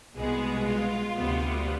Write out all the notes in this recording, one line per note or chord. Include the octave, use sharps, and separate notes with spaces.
C2 B2 G#3 B3 G#4
F4
D2 C3 G3 B3